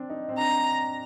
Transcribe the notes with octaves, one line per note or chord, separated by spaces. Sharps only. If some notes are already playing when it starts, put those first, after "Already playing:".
Already playing: C4 D4
D#4
C4
D4 A#5